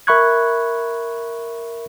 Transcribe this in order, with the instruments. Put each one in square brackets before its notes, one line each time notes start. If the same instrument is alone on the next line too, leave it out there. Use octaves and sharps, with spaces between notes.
[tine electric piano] A#4 E5 B5 C#6 F#6 G#6